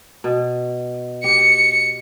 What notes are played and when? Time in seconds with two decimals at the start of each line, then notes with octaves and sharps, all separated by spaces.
0.24 B2
1.24 G4 C#7